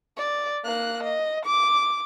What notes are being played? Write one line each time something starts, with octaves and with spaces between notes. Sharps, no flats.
D5
A#3 F#6
D#5
D6